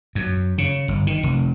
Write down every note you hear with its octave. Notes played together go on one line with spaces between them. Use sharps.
F#2
C#3
G1
D#3
F1